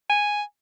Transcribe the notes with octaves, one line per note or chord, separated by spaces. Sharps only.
G#5